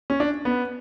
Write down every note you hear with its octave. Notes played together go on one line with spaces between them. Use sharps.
C#4
D4
B3